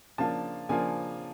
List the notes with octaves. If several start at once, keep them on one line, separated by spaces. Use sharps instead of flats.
C#3 F3 A#3 D4 F4 A5
C#3 F3 A#3 D4 F4 G#5